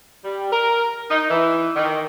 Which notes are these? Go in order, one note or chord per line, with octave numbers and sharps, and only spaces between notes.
G3
A#4
D#4
E3
D#3